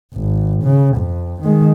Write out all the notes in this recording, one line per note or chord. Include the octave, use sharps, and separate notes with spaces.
G#1
C#3
F2
D#3 G#3